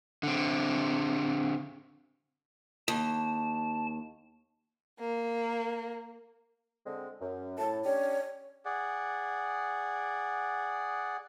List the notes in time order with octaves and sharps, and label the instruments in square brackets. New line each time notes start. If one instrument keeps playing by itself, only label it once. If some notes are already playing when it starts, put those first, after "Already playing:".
[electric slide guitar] D3 C4
[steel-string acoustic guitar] D#2 [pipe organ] A5
[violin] A#3
[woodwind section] D3 G#3 C4
F#2
[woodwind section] A2 [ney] A5
[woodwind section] C#4 D4 G4 [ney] C#5
[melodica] G#4 D5 F#5